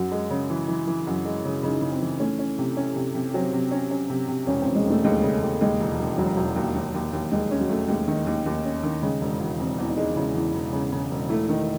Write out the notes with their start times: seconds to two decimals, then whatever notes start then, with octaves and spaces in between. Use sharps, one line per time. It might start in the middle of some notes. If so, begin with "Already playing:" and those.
Already playing: F#2 F#4
0.12 G#3
0.30 C#3
0.50 E3
0.68 E3
0.87 E3
1.07 F#2 F#4
1.25 G#3
1.45 C#3
1.63 C#3 D#4
1.82 C#3
1.92 C4
2.02 E3
2.20 A3 C#4
2.39 C#4
2.58 C3
2.77 C#4
2.96 C3
3.15 C3
3.34 F#3 C4
3.53 C3
3.71 C#4
3.91 C#4
4.10 C3
4.28 C3
4.47 E1 C#4
4.61 C4
4.66 E1
4.75 G#3
4.85 E1
4.90 A3
5.04 D#2 G#3
5.23 C#3
5.42 D#2
5.61 D#2 G#3
5.80 E1
5.99 E1
6.18 E1 F#3
6.37 E1
6.56 D#2
6.75 D#2
6.94 D#2
7.13 D#2
7.32 D#2 G#3
7.51 C#4
7.60 F#3
7.70 A3
7.88 D#2 G#3
8.08 D#3
8.26 D#2
8.46 D#2
8.65 C#4
8.83 D#3
9.02 C#3 G#3
9.21 E1
9.40 E1
9.59 E1 C4
9.78 E2
9.88 D#4
9.97 G#3
10.16 C#3 E4
10.35 E2
10.54 E1
10.73 C#3
10.92 C#3
11.11 E1
11.29 A3 E4
11.49 D#3